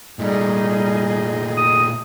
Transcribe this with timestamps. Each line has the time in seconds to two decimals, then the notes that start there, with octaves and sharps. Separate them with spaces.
0.19 A#2 G3 A3 D#4 G#4 D#5
1.57 D#6